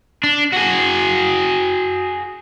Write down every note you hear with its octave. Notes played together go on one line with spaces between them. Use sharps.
D4
F#4 G#4